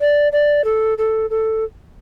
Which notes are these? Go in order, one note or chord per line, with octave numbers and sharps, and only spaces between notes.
D5
D5
A4
A4
A4